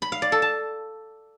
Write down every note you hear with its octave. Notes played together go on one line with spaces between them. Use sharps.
B5
F5
D5
A4
A5